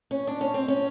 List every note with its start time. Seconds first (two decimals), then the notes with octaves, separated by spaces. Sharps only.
0.11 C#4
0.27 D4
0.41 C#4
0.54 C4
0.68 C#4